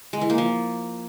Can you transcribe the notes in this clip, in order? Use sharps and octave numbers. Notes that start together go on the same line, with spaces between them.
G#3
E3
A#3
F3